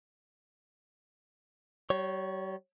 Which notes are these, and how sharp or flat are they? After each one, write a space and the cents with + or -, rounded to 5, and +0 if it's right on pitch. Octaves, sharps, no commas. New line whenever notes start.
G3 -40 C#5 +0